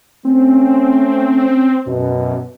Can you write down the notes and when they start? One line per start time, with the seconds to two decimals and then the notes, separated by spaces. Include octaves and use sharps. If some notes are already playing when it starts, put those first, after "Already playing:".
0.25 A3 C4 C#4
1.87 F#2 B2